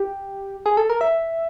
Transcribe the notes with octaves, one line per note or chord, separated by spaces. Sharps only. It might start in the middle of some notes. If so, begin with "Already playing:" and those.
Already playing: G4
G#4
A4
A#4
E5